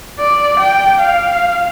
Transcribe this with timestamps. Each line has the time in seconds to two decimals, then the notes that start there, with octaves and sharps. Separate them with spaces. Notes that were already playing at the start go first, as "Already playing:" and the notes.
0.19 D5
0.60 G5
1.01 F5